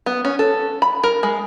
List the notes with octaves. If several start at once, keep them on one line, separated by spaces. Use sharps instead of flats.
B3
C#4
A4
B5
A#4
G#3